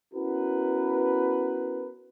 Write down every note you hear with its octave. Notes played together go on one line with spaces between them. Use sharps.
B3 C#4 E4 F#4 A#4 B4